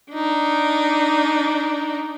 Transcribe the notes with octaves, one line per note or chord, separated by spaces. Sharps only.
D4 D#4